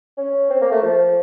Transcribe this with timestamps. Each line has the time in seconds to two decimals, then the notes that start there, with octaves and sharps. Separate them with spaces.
0.17 C#4
0.50 C4
0.61 A#3
0.72 A3
0.82 F3